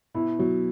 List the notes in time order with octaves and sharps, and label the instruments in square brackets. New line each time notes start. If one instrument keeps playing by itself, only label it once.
[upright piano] B2 [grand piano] E4
[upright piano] B2 [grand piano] F#3